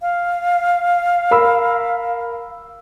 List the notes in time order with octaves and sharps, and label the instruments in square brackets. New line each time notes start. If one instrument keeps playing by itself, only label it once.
[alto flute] F5
[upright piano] A#4 B5 E6